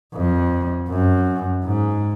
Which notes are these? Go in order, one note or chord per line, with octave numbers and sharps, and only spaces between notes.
F2
F#2
G#2